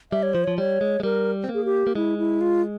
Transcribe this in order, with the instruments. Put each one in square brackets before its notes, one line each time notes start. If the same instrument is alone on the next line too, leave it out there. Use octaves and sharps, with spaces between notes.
[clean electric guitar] G3 [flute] E5
[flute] C#5
[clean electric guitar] F3 [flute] C5
[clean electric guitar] F3 [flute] C#5
[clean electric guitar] G3 [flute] C#5
[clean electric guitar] G#3
G#3
[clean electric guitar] G3 [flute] A#4
[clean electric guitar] C4
A#3
[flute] G#4
G4
[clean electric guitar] A#3
[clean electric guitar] G#3 [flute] E4
[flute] E4
F4